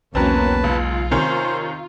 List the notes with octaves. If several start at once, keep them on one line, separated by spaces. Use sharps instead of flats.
B1 E2 F#3 A#3 C4 C#4 B4 A5
C#2 F4
C3 D#3 C#4 C5